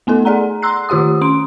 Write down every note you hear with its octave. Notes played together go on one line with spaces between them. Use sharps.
A3 B3 D#4 A4
G#4 D5 F#5 A#5
A#5 C6 E6 F#6 C7
D#3 F4 G4 F#5 D#6
C#4 C6 D7